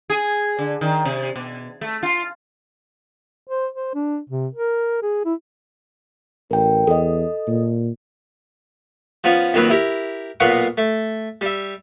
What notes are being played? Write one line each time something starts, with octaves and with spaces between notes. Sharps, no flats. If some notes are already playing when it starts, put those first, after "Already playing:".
G#4
D3
D#3
C3
B2
A3
F4
C5
C5
D4
C3
A#4
G#4
E4
A1 A#4 G5
E2 A4 D#5
A#2
F3 B3 C#4 F4
F2 D#3 F#3 A#3 B4
E4 G4 A#4
B1 A#2 B3 F5 F#5 C#6
A3
G3 E5